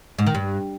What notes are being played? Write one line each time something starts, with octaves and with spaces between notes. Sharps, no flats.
G#2
D#3
G2